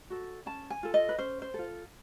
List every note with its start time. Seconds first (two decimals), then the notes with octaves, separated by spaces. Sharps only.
0.10 F#4 A4
0.46 C#4 A5
0.70 G#5
0.83 F4 A4
0.94 D#5
1.09 B4
1.18 C#4 C5
1.42 C5
1.54 F4 A4